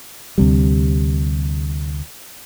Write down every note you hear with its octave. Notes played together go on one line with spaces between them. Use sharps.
D2 C3 G3